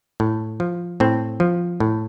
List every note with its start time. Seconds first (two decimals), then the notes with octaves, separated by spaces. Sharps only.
0.20 A2
0.60 F3
1.00 A2 C4
1.40 F3
1.80 A2